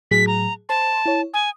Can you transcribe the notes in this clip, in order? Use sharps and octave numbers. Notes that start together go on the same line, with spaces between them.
A2 F#3 G#4 B6
A#5
C5 A5 C6
E4 C#5
G#5 D#6